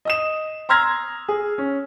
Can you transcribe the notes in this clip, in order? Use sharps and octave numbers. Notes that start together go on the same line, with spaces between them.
D#5 D#6 E7
A#5 C6 E6 F6 G#6 A#6
G#4
C#4